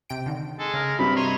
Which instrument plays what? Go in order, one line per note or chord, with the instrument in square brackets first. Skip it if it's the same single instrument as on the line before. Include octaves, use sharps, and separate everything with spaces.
[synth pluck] C3 G5 D7
D3 D#3
[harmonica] G#3 [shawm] A4
[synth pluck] C#3 [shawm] A#4
[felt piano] G2 C3 [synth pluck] A#3 C4 [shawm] B5
[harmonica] C#5 D#5 A#5 [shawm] C6